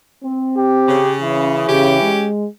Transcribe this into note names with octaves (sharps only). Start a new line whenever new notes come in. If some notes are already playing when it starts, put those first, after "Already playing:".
C4
G4
C#3
E3 C#4
C#3 C#4 G4
G#3